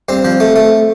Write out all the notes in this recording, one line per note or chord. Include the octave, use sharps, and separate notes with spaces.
G2 C4
F3
A3
A3